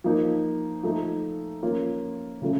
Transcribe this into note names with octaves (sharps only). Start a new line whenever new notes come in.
F3 A#3 D#4
F3 A3 D#4
F3 A#3 C#4 F4
C#3 F3 A3